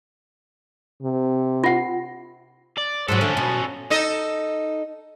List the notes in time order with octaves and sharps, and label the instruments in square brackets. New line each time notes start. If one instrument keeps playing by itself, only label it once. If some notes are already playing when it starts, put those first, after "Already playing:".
[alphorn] C3
[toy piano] F4 F#5
[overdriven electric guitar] D5
[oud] G#2 B2 F#3 [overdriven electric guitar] C#4 A4
[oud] D3 A3
B2
[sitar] D#4 A4 D#5